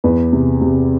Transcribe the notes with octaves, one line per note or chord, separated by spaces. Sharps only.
E2 B4
C3
C3